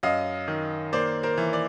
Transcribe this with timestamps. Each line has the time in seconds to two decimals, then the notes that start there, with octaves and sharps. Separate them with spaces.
0.03 F#2 D#5 F5
0.48 D#3
0.93 A#3 C5 D5
1.23 A#4 C5
1.38 E3
1.53 D5